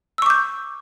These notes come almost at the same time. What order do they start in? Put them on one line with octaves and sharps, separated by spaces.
E6 C#6 D6 G6